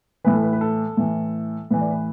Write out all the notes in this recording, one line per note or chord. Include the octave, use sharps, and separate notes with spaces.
A2 E3 B4
A4
B4
B4
A4
A2 E3
A2 E3 B4
D5
B4